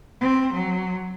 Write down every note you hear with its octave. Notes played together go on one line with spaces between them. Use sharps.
C4
F#3